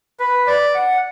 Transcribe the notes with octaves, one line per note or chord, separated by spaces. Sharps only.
B4
D5
F#5